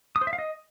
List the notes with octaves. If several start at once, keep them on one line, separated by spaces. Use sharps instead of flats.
D#6
C5
E5
F5
D#5